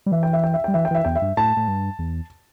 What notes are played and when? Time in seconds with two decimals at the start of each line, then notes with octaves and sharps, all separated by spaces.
0.06 G3
0.12 E3 E5
0.23 G5
0.33 E5
0.44 G5
0.54 E5
0.64 G3 G5
0.74 E3 E5
0.85 G5
0.91 E3 E5
1.05 E2 G5
1.15 E5
1.22 G2
1.37 A2 A5
1.57 A2
1.68 G2
1.99 E2